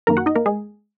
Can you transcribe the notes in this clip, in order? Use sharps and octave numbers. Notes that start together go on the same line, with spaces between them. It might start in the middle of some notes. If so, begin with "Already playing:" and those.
F#2 D#3 A#3 A#4 A#5
F#4 F#5
D#4 D#5
A#3 A#4
G#3 G#4